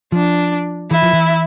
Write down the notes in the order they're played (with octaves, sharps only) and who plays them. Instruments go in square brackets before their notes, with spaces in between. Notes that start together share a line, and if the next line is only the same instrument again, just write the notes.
[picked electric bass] F3 [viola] D4
[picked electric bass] E3 [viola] E4
[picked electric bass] F3
E3